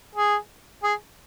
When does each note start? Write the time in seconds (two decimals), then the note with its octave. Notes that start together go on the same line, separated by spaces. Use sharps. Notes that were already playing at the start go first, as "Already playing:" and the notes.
0.15 G#4
0.83 G#4